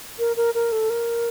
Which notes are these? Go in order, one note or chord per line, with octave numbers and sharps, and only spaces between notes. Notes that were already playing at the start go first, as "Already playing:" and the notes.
A#4
A#4
A#4
A4
A#4